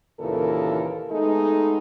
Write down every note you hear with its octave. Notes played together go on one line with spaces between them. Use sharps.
D#2 A#2 C#3 E3 A4 A#4
G#3 A3 B3 D#4 A4